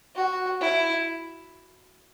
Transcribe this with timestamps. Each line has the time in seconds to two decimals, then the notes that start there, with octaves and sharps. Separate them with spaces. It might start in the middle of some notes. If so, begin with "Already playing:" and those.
0.16 F#4
0.61 E4